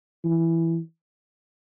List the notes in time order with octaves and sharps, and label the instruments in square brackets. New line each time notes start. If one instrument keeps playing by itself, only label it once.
[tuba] E3